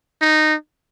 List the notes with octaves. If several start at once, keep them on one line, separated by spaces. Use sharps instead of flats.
D#4